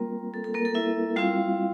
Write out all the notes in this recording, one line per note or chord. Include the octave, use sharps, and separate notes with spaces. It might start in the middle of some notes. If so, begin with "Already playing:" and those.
Already playing: G3 A#3 C4 F4 A#4
A4
A4
A#3 A#4
A4
E4 E5
G3 C4 E4 F4 F5